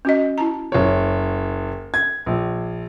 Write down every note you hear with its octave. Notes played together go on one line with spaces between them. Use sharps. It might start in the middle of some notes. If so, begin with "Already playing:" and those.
C#4 F#4 D#5
E4 A5 A#5
F#1 C#5
G#6
A#1